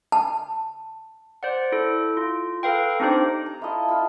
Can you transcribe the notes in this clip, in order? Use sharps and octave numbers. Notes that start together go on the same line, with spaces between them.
A5
C5 D5 F#5
E4 A4
F4
A4 B4 F5 G5
C4 D4 D#4 G4 C5
A#5
E4 F4 A4 D#5
F4 B5